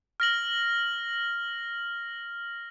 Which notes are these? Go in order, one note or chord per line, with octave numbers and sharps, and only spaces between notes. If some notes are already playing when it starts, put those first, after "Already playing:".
F6 A#6 F#7